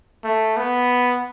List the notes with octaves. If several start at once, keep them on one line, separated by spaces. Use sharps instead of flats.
A3
B3